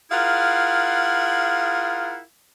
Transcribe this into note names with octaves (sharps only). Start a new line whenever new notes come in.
E4 F4 G#4 A#4 F5 F#5